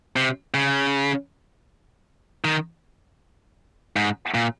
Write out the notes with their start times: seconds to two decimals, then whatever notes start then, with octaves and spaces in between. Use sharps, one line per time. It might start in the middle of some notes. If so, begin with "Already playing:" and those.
0.16 C3
0.54 C#3
2.44 D#3
3.96 G#2
4.34 A#2